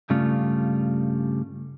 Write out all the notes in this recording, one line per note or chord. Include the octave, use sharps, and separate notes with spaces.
G2 C#3 G3 A3 F4